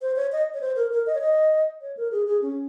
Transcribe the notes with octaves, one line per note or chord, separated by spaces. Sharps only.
C5
C#5
D#5
C#5
C5
A#4
A#4
D#5
C#5
D#5
C#5
A#4
G#4
G#4
C#4